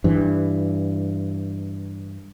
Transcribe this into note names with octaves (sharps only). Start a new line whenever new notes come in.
G2 E3